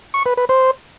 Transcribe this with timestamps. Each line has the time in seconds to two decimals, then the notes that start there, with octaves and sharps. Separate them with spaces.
0.14 C#6
0.26 B4
0.37 B4
0.49 C5